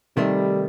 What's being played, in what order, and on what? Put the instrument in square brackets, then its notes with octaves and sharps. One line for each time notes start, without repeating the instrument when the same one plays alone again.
[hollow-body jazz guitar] C3 D#3 A3 [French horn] G3